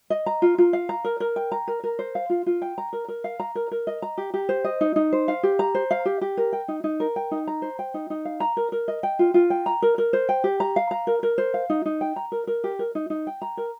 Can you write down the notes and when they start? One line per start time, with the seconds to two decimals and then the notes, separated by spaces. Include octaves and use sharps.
0.10 D#5
0.26 A#5
0.42 F4
0.58 F4
0.73 F5
0.89 A#5
1.04 A#4
1.20 A#4
1.36 G5
1.52 A#5
1.68 A#4
1.84 A#4
1.99 C5
2.15 F5
2.30 F4
2.46 F4
2.62 G5
2.78 A#5
2.93 A#4
3.08 A#4
3.24 F5
3.40 A#5
3.55 A#4
3.71 A#4
3.87 D#5
4.02 A#5
4.18 G4
4.34 G4
4.49 C5
4.64 D#5
4.81 D#4
4.96 D#4
5.12 C5
5.28 F5
5.43 G4
5.59 A#5
5.75 C5
5.91 F5
6.05 G4
6.21 G4
6.37 A#4
6.53 G5
6.68 D#4
6.84 D#4
7.00 A#4
7.16 G5
7.31 D#4
7.47 A#5
7.62 C5
7.79 G5
7.94 D#4
8.10 D#4
8.25 F5
8.40 A#5
8.57 A#4
8.72 A#4
8.88 D#5
9.03 G5
9.19 F4
9.34 F4
9.50 G5
9.66 A#5
9.82 A#4
9.98 A#4
10.13 C5
10.29 G5
10.44 G4
10.60 A#5
10.76 F5
10.91 A#5
11.07 A#4
11.23 A#4
11.38 C5
11.54 F5
11.70 D#4
11.86 D#4
12.01 G5
12.16 A#5
12.32 A#4
12.47 A#4
12.64 G4
12.79 A#4
12.95 D#4
13.10 D#4
13.27 G5
13.42 A#5
13.57 A#4